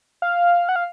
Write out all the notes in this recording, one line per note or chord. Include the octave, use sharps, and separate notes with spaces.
F5
F#5
F5